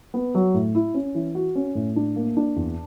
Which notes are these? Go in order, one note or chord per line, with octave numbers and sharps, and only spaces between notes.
B3
F#3
A2
E4
C#4
E3
F#4
C#4
A2
D4
A#3
D4
E2